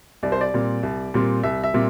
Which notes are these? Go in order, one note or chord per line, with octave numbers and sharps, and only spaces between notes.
C2 D5
C5
D5
A#2 G3 C4
C2
A#2 G3 C4
C2 E5
E5
A#2 G3 C4